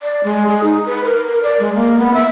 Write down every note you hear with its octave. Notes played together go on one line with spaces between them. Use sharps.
D5
G#3
G#4
D#4
B4
A#4
A#4
D5
G#3
A#3
B3
E5